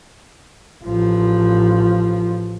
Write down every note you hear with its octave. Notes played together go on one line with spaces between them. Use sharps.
A1 F3